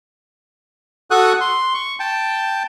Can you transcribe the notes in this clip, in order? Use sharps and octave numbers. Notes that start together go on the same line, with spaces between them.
F#4 A4 F#5 C#6 D#6 F#6
C6
C#6
G5 A5